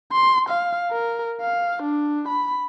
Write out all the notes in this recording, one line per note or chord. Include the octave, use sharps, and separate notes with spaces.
C6
F5
A#4
F5
D4
B5